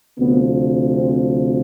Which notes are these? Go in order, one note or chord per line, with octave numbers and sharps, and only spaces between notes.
D2 C3 F3 B3
C4